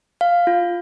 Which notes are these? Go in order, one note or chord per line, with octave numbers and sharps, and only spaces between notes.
F5
F4